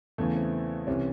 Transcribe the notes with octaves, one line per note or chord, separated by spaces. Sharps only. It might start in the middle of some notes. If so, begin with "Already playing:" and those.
E2 C#3 E3 A3
C4
C2 C3 E3 C#4